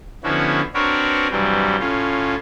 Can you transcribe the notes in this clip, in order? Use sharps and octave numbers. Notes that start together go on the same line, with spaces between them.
D3 F3 B3 C#4 E4 F#4
C4 D4 F#4 A#4 B4 C#5
G2 C3 E3 F#3 G3
A2 C#4 F4